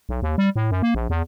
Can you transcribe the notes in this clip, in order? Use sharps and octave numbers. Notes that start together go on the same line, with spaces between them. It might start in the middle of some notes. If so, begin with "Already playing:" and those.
B1
D#2
G3
A2
F#2
A#3
A#1
E2